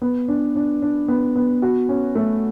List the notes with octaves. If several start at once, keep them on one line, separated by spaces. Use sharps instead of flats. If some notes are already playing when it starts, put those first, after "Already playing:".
B3
D4
D4
D4
B3
B3
F#4
C#4
A3